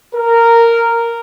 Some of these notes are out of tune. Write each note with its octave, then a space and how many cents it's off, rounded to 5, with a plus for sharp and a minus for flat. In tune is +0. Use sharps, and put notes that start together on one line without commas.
A#4 -10